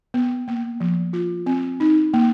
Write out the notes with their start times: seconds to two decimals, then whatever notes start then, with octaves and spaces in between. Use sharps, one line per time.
0.14 B3
0.48 A#3
0.80 F3
1.13 F4
1.46 C4
1.80 D#4
2.14 A#3